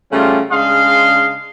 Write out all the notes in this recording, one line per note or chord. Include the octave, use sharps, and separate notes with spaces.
C#3 G3 A3 C#4 F4
C#3 G#3 D4 D#5 F5 C6